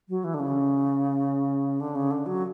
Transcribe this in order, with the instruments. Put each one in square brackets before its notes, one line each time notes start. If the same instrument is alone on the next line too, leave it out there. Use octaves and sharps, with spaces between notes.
[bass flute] F#3
E3
D3
C#3
D3
C#3
D3
F#3